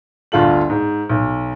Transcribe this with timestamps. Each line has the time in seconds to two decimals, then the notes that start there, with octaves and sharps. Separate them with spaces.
0.32 G1 D2 F4 A4 F#7
0.70 G#2
1.09 B1